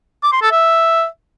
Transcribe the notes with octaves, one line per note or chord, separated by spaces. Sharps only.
D6
C6
A4
E5